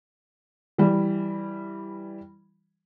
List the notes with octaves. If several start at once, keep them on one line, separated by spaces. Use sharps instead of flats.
E3 G3